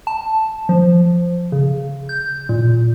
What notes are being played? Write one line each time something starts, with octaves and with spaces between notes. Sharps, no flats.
A5
F3
C#3
G6
A#2